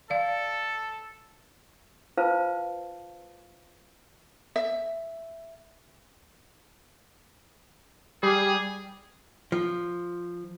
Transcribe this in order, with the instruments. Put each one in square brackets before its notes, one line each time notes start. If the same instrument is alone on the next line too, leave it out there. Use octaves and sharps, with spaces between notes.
[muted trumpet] A4 [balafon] D5 F5
[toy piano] F4 B4 C5 F5 A5
[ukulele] E5
[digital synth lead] G3 [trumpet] G#4
[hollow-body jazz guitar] F3